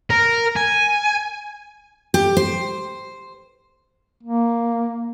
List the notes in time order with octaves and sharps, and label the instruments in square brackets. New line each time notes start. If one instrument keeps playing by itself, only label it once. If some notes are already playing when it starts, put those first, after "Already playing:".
[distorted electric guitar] A#4
G#5
[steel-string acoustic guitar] G4
C5
[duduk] A#3